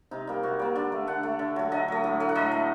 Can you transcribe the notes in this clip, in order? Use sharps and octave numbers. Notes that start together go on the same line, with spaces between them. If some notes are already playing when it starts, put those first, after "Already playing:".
C3 D#4
G3 A#3
C3 F#4
G3 A#3 D5
D3 D5
A3
D3 F#5
A3
D3
F#3 A3
D3 D#5
F#3 A3
A2
A3
F#5
A2 D#5
A3